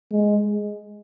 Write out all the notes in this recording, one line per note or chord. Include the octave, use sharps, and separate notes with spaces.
G#3